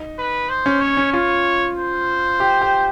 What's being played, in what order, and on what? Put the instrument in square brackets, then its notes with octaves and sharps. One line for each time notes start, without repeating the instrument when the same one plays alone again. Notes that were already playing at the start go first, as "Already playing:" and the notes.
Already playing: [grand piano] D#4
[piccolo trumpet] B4
C5
[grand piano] C#4
[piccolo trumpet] C#5
[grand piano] C#4
[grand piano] F4 [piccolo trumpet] C#5
[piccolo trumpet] C5
[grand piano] G4
G4